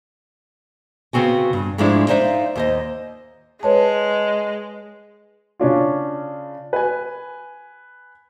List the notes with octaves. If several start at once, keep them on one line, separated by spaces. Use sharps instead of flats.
C#3 B3 C4 F#4 G#5
G2
G#2 F3 G#3 A3 D4 E4
D#4 C5 D5 E5 F5
D#2 C5 D#5
G#3 B4 C#5 A5
C#3 C#4 D4 F4
B4 G#5